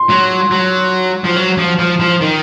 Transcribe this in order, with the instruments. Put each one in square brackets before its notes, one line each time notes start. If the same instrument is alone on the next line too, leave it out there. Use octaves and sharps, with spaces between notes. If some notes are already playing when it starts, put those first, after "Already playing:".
Already playing: [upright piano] C6
[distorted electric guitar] F#3
F#3
F3
F#3
F3
F3
F3
D#3